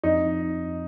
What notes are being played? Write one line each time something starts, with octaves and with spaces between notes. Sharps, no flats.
F2 D#4